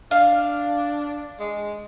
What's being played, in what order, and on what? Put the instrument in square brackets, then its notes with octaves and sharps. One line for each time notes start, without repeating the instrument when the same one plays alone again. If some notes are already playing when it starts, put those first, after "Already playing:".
[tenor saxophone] D4 [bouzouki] F5
[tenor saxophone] G#3